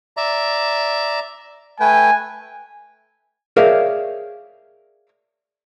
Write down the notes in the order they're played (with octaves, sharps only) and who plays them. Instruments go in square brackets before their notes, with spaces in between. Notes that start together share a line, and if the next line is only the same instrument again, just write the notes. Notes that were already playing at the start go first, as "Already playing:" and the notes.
[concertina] D5 E5 A#5
[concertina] A3 B4 G5 [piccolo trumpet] G#5
[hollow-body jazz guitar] G#4 A#4 C#5 D5 E5 F5